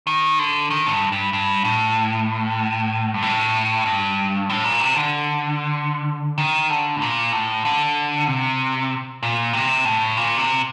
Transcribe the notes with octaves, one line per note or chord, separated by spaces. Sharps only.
D#3
D3
D#3
A2
G2
G2
G2
A2
G2
A2
G2
A2
A#2
C3
D3
D#3
D3
A2
A#2
A2
D3
C3
A#2
C3
A2
A#2
C3